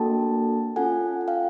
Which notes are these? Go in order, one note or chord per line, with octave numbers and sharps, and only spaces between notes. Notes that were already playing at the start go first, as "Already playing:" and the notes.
Already playing: A#3 D4 F#4 A4 G5 A5
C#4 F4 A4 F#5 G#5
F#5
F5 G5